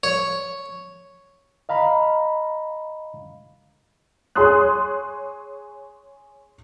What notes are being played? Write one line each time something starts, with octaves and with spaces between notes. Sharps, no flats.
C#5
D#5 F5 A#5 B5
G#4 C#5 C6 D#6 F#6